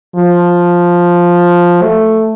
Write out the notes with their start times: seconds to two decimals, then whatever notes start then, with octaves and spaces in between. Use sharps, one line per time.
0.16 F3
1.82 A3